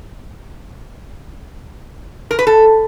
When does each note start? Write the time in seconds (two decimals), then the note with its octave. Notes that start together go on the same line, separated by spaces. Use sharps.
2.31 A#4
2.39 B4
2.47 A4